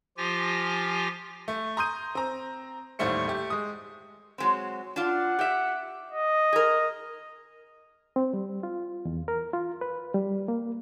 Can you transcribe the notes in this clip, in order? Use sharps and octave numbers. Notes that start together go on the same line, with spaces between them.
F3 F4 G4 G#5 A#6
A3
A#5 C6 D#6 G6 D#7
C4 A#5
A1 D#2 G3 A3 C5 C#7
A3 G4
G#3 D#6
F#3 G#3 C4
D4 F4 F#5
G4 E5
D#5
G#4 A#4
C4
G3
F4
E2
A#4
F4
B4
G3
A#3